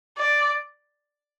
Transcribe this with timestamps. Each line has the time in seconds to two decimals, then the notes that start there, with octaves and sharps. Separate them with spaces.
0.18 D5